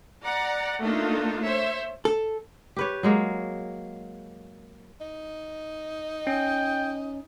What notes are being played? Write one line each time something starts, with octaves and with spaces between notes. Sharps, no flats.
D5 F#5 A#5
A3 A#3 D4 D#4 F4
C5 C#5 E5
A4
G4 B4 C#5
F#3 G#3 A#3
D#4
C#4 G5